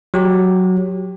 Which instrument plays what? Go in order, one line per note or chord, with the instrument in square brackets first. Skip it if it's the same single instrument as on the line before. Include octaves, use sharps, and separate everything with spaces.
[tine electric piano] F#3 G4